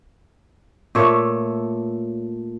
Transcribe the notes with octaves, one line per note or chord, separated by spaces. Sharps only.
A#2 A3 C#5 E5